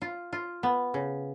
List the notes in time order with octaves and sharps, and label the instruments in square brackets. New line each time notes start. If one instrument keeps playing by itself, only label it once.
[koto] F4
F4
B3
C#3